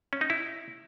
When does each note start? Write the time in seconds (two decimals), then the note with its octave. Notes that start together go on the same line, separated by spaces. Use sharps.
0.13 C#4
0.21 D#4
0.30 E4